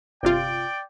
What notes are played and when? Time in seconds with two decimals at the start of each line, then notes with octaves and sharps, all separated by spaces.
0.23 G1 C3 F4 D5 G5